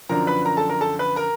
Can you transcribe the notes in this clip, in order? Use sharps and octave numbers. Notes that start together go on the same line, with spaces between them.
F#2 D3 F3 A#4 A#5
B4 B5
A#4 A#5
A4 A5
A#4 A#5
A4 A5
B4 B5
A#4 A#5